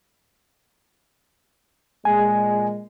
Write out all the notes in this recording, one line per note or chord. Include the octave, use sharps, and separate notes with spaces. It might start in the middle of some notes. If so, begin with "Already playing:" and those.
A#2 G#3 G#5